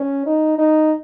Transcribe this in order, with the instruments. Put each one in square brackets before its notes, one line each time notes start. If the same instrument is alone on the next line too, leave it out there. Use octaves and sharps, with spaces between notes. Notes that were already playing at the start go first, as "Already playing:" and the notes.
Already playing: [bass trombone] C#4
D#4
D#4